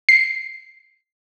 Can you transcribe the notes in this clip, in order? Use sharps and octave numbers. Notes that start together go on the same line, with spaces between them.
C7